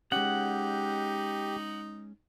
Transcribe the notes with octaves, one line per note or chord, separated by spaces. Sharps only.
G#3 C#4 D#4 G4 F#5